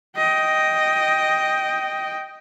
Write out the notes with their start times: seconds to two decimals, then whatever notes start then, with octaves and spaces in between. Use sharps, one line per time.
0.17 D#5 G5